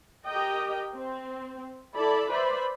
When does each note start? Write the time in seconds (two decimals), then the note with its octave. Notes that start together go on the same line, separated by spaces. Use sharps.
0.26 G4 A#4 D#5 G5
0.95 C4
1.95 E4 A4 D5 A5 B5
2.30 B4 C5 D5 E5 B5